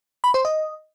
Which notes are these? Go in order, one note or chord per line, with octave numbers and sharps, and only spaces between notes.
B5
C5
D#5